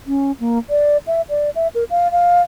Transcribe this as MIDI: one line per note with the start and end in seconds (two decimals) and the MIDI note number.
0.07 0.32 61
0.40 0.58 58
0.70 0.97 74
1.07 1.22 76
1.30 1.50 74
1.55 1.68 76
1.75 1.84 70
1.90 2.11 77
2.12 2.42 77